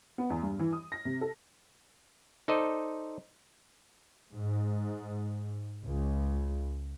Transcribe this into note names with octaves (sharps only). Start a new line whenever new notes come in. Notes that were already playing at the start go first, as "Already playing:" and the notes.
B3
E2
G2
E3
D#6
A#6
C3
A4
D#4 A4 C5 D5 D#5
G#2
C#2